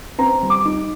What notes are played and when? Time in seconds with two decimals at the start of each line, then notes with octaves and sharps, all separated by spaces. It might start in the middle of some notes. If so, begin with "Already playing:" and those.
0.18 C4 A#5
0.43 G3
0.50 D6
0.65 D#4